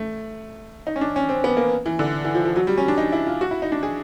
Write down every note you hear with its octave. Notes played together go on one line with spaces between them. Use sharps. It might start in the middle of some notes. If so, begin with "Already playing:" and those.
Already playing: A3
D#4
C#4
D4
C#4
C4
B3
A#3
E3
D3
E3
F3
F3
F#3
G3
C#4
D4
D#4
E4
F4
F#4
E4
D#4
D4
G#4